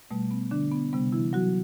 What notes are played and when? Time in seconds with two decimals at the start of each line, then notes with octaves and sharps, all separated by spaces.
0.11 B2 G3 A3
0.31 B3
0.51 D3 D4
0.71 B3
0.93 C3 G3 B3
1.12 E3 E4
1.33 F#3 F#4